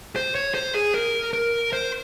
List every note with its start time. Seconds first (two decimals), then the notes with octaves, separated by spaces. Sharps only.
0.16 C5
0.35 C#5
0.54 C5
0.74 G#4
0.94 A#4
1.33 A#4
1.73 C5